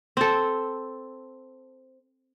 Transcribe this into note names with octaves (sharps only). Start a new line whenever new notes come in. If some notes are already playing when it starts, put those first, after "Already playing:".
C4 A4